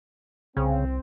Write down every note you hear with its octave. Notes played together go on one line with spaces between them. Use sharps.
C2 C#3 C4